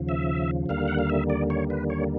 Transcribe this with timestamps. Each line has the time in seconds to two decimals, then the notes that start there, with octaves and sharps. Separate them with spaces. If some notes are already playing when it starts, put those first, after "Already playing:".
Already playing: D#2 C#3 F3
0.09 E5
0.69 D#2 D3 G3 A#3 F5
0.88 F#5
0.99 F5
1.10 E5
1.30 D5
1.50 C#5
1.70 B4
1.90 C#5